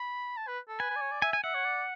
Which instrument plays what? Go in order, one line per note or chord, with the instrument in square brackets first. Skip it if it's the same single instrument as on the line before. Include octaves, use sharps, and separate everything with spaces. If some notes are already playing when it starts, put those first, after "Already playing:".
Already playing: [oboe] B5
A5
B4
A4
[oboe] B4 [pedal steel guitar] G#5
[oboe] B4
D5
C#5
D5
[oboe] E5 [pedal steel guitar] G#5
[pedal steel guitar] G#5
[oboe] E5 [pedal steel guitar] F#5
[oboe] C#5
D5